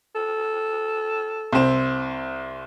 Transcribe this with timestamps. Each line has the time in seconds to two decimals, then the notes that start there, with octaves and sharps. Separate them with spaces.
0.15 A4
1.52 C2 C4